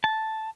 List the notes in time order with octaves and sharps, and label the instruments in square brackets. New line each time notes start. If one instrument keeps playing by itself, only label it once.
[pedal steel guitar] A5